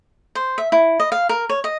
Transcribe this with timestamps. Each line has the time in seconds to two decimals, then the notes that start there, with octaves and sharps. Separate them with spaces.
0.35 C5
0.58 E5
0.72 E4
1.00 D#5
1.12 F5
1.29 A#4
1.49 C#5
1.64 D#5